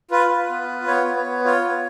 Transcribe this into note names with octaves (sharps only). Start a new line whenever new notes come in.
F4 B4
F4
B3
F4
B3 C#5
B3
C#5
B3
F4 C#5
B3